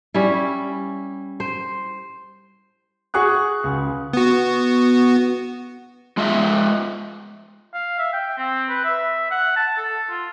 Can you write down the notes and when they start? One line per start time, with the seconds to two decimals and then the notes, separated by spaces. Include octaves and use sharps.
0.14 G3 C#4 E4
1.40 C5
3.14 F#4 G#4 C#6 F#6
3.64 C#2
4.13 B3 F#4
6.17 G#3 F4 D#5 E5
7.74 F5
7.99 E5
8.13 G5
8.38 C4
8.69 B4
8.85 E5
9.31 F#5
9.56 A5
9.77 A4
10.10 F4